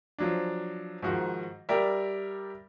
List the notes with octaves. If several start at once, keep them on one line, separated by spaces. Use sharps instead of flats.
F3 F#3 D4
G#2 D#3 F3 F#4
G3 G4 A#4 D5 E5